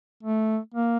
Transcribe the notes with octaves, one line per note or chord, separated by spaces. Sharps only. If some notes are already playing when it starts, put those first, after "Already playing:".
A3
A#3